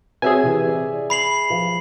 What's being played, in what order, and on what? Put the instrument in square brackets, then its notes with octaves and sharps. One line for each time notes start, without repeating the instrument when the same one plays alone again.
[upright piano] C4 F#4 C#5 [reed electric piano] G#4 E5 G#5
[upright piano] C3 E3
D5
[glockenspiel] B5 C7 F#7
[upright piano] F3